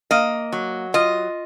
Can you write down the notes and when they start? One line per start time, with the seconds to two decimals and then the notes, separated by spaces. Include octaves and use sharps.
0.11 A#3 D#5
0.52 F#3
0.94 F4 D#5